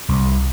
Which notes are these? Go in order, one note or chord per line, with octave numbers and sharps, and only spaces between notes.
C2